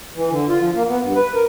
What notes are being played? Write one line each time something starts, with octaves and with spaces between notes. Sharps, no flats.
E3
D3
F4
F3
A#3
B3
G2
B4
A#4